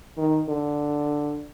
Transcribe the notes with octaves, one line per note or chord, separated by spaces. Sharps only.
D#3
D3